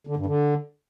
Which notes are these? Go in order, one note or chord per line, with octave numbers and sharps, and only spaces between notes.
D3
G2
D3